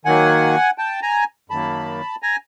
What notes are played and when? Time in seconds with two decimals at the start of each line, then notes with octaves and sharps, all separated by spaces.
0.05 D#3 F#3 A#3 F#5 G#5
0.78 G5 A5
1.02 G#5 A#5
1.50 F#2 D#3 F#3 A#3 A5 B5
2.22 G#5 A#5